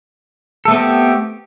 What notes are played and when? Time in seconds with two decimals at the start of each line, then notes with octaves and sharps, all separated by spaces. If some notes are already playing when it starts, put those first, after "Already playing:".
0.65 A4
0.68 A3
0.71 B3
0.73 C4
0.76 G4